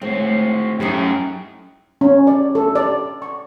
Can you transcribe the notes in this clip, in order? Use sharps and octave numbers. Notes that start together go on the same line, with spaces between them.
D2 A2 G#3 C4 F#4
F#2 A3 D#4 E4 F#4 G4 D#5 G5
C#4
D5
A4
D5
C#6